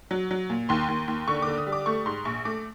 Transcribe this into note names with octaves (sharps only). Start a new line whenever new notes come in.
F#3
F#3
A#2
D#2 C6
D#2
D#2
D3 C#6
D3 D6
D#6
G3
D6
A3 C#6
G#2 C6
A#1 C#6
A3 D6